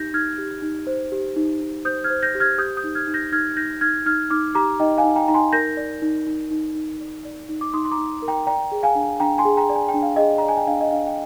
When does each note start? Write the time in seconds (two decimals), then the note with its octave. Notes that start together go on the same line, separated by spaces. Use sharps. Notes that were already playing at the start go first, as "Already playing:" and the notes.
Already playing: D#4 G4 G6 A#6
0.13 D#4 F6 G#6
0.38 G4
0.62 D#4
0.87 C5
1.12 G4
1.36 D#4
1.61 D#4
1.85 C5 D#6 G6
2.04 F6 G#6
2.10 C5
2.23 G6 A#6
2.35 G4
2.40 F6 G#6
2.58 G4 D#6 G6
2.77 D#6 G6
2.84 D#4
2.95 F6 G#6
3.07 D#4
3.14 G6 A#6
3.32 D#4 F6 G#6
3.56 D#4 G6 A#6
3.81 D#4 F6 G#6
4.06 D#4 F6 G#6
4.30 D#4 D6 F6
4.55 G4 A#5 D6
4.80 D#4 D#5 G5
4.98 F5 G#5
5.04 D#4
5.16 G5 A#5
5.28 D#4 A#5
5.34 G#5 C6
5.53 A#4 G6 A#6
5.77 D5
6.02 D#4
6.27 D#4
6.51 D#4
6.75 D#4
7.00 D5
7.25 D5
7.49 D#4
7.61 D6
7.73 D#4 C6 D#6
7.85 C6
7.91 A#5 D6
7.98 D#4
8.22 A#4
8.28 G5 A#5
8.47 D5 G5 A#5
8.72 G#4
8.83 F5 G#5
8.95 D4
9.20 D4 G5 A#5
9.38 G#5 C6
9.45 G#4
9.57 G5 A#5
9.69 D5
9.75 G#5
9.88 G5
9.94 D4
10.02 F5
10.16 G#4 D#5 G5
10.38 D5 A#5
10.48 G#5
10.57 G5
10.67 D4 F5
10.80 D#5
10.92 D4 F5
11.07 G5